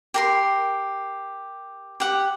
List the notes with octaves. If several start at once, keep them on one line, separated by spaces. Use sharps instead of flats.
G4 A#4 C6
G4 F#5